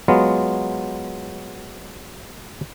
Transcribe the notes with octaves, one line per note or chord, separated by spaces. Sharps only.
F#3 G#3 B3 F4